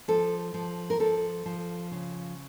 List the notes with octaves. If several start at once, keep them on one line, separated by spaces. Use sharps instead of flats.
F3 A4
F3
A#4
F3 A4
F3
C#3